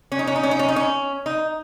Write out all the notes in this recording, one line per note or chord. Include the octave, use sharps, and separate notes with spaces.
C#4
D#4
C#4
D#4
C#4
D#4
C#4
D#4
C#4
D#4